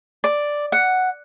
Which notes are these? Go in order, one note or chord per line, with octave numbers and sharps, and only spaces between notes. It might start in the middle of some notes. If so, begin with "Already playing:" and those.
D5
F#5